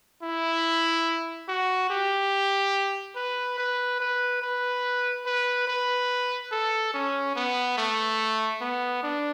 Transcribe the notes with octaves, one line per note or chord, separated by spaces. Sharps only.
E4
F#4
G4
B4
B4
B4
B4
B4
B4
A4
C#4
B3
A3
B3
D4